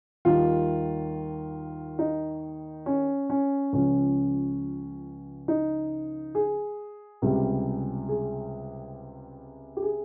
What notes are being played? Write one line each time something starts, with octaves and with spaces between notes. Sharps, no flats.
D#2 D#3 G3 F4
D#4
C#4
C#4
C#2 C#3 F3 C#4
D#4
G#4
C#2 C3 G3
G#4
G4
G#4